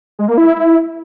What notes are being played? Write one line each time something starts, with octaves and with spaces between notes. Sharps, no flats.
G#3
A#3
E4